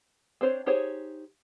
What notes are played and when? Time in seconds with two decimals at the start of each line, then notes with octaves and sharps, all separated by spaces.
0.41 C4 D4 C5 C#5
0.66 D#4 G4 G#4 C5 C#5